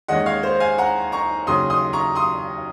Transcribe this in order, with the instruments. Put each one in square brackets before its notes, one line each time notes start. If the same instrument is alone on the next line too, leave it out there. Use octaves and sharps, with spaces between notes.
[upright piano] D#2 D#3 G#3 C#4 D#5 F#5
C#5 F5
C5
F5 G#5
F#5 A#5
A#5 C#6
D#2 C#3 F#3 C6 D#6
C6 D#6
A#5 C#6
C6 D#6